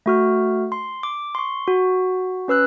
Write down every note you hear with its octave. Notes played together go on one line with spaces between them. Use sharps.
A3 F#4 F6
C6
D6
C6 C#6
F#4
C#4 B4 E6 F#6